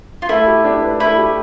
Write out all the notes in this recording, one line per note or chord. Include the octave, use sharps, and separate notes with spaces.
F4
A3 E4
G4
D4
B4
A3 E4
G4